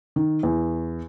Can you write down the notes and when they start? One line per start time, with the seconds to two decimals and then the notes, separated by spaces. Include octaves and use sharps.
0.16 D#3
0.43 E2